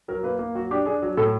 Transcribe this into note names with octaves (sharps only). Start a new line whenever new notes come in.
F#3 A#4
A#3 B4
A#3
F#3 F#4
D4 G4
D4 G#4
F#3
A2 A4